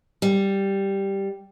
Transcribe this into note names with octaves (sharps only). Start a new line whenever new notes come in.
G3